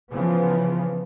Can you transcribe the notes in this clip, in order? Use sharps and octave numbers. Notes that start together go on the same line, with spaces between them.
C#3 E3 F3 B3